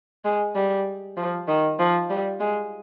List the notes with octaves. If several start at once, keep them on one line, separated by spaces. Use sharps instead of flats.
G#3
G3
F3
D#3
F3
G3
G#3